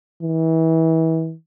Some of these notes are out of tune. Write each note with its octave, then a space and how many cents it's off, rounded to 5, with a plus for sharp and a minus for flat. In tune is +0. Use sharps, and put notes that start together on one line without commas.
E3 -30